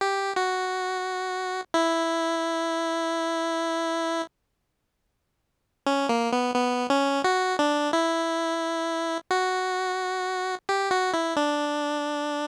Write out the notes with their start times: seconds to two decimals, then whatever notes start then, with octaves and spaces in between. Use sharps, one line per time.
0.01 G4
0.36 F#4
1.74 E4
5.86 C#4
6.09 A#3
6.33 B3
6.55 B3
6.90 C#4
7.24 F#4
7.59 D4
7.93 E4
9.31 F#4
10.69 G4
10.91 F#4
11.14 E4
11.36 D4